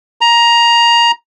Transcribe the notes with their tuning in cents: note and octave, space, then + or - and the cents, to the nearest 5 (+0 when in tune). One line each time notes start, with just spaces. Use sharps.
A#5 +15